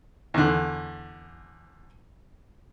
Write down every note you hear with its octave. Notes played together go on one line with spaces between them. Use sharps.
E2 D3